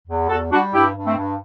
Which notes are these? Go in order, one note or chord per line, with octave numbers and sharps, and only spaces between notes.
E2
E2 F#4 A4
G3 D4 F#4
G2 E4 G4
G2
A3 C4
G2